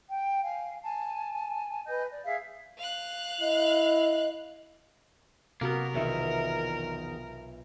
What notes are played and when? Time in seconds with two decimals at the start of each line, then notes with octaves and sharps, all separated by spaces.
0.09 G5
0.43 F5 G#5
0.83 G#5 A5
1.87 B4 D#5 G#5 G6
2.10 D5
2.24 G#4 E5 F5
2.78 F5 F#6
3.41 E4 D#5
5.61 C3 A#3 B3 F#4 A#4
5.95 B1 E2 D#3 F4 E5